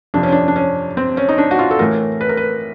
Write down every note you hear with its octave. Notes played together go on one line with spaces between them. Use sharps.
F2 C3 F3 D4
C#4
D4
D4
C#4
C4
C#4
D#4
D4
F#4
F4
A4
A2 E3 A3 A#4
B4
A#4
B4